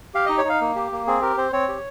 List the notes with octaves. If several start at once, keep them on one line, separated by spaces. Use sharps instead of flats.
G4 F5
D#4 D#5
C#5
D#4 F5
A#3
G4
A#3
C4 G#4
G4 A#4
C4 C5
C4 C#5
G4